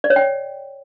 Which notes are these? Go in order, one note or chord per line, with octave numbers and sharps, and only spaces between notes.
D5
C#5
G5